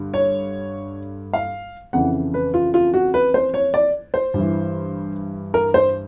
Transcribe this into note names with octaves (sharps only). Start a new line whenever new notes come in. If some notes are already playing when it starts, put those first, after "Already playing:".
Already playing: G2 D3
C#5
F5
F2 C#3 E3 F#5
B4
F4
F4
F#4
B4
C5
C#5
D5
C5
G2 E3
A#4
C5